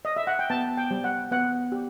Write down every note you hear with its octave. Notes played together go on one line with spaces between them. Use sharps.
D#5
E5
F#5
G5
B3 A5
G5
G3
F#5
B3 F#5
G4